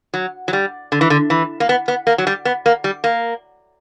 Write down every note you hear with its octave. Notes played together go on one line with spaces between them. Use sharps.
F#3
F#3
G3
D3
E3
D3
E3
A#3
B3
B3
A#3
F#3
G3
B3
A#3
G3
A#3